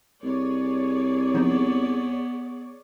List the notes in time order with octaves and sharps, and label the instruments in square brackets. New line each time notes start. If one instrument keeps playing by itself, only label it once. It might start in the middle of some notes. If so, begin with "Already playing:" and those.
[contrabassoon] C2 [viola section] G#4 C#5 D5
[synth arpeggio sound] F3 D#4 [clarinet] B3